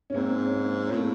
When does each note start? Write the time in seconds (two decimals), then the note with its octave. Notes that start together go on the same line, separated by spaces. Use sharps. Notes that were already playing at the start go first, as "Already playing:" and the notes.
0.10 C#4
0.14 G#2 A#3 C4
0.45 C#4
0.55 A#3 C4
0.87 A#2 C#4
0.97 A2 A#3 C4